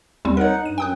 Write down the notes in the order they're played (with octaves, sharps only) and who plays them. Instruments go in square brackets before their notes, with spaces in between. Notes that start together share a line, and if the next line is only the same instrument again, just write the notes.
[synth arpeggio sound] D#2 G3 C4
[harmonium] D#4 F#5 [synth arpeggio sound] A#4 C#5
[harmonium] G2 [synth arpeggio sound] D#7
[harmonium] F#2 [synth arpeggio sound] G5 D#6 F#6